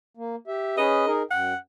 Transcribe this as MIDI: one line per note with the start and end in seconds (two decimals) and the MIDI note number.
0.17 0.36 58
0.47 0.76 67
0.47 0.76 76
0.78 1.05 61
0.78 1.05 68
0.78 1.05 71
0.78 1.11 75
1.07 1.23 63
1.07 1.23 68
1.07 1.23 70
1.31 1.54 42
1.31 1.57 78
1.31 1.54 79